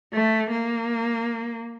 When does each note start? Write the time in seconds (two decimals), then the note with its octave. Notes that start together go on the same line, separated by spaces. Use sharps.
0.15 A3
0.52 A#3